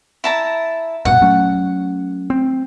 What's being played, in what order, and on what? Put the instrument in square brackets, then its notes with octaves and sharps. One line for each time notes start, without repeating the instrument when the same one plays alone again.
[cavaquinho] E4 A5 A#5
[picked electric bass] A#1 G2 B2 [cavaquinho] F#5
[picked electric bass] F#3 A3 C#4
C4